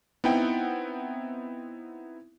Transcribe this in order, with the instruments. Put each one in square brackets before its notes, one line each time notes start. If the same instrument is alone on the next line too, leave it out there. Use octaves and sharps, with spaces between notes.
[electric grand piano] B3 C4 D#4 E4 F#5 G5